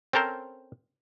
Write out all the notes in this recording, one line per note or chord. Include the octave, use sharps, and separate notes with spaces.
C4 C#4 A4 A#4 C5